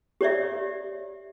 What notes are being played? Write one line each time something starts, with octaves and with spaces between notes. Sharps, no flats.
G4 C#5 D5 E5